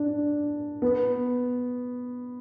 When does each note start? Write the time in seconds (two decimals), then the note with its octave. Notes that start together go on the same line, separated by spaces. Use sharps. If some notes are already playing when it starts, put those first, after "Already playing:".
Already playing: D4
0.82 B3